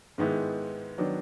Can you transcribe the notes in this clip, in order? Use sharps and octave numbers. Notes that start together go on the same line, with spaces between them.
G#2 D#3 G#3 B3 E4
D#3 F#3 B3 D4